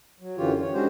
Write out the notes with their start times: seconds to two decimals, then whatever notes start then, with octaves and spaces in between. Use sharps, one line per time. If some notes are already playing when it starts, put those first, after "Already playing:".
0.20 F#3
0.37 F#2 D3 E3 F4 G4 C#5
0.60 C#5
0.74 G#3 C#4 D4 F#4 G4 C5